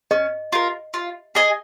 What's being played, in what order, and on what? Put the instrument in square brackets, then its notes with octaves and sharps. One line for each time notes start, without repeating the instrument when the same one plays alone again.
[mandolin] C#4 [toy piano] D#5
[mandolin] F4 A#4
F4
G#4 D#5 G#5